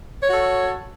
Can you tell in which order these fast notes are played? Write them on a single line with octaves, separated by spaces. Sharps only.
C#5 F#4 A4